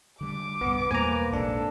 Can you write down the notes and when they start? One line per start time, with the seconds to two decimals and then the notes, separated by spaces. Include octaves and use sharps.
0.21 D3 G3 D6
0.61 C2 G2 B3
0.91 E2 B2 G3 A#3 B4 C5 G#5 A#5
1.33 A#1 G#2 C3 D4 A4